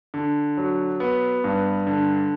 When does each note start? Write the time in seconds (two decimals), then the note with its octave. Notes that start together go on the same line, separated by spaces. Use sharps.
0.14 D3
0.57 F#3
1.00 B3
1.44 G2
1.87 D3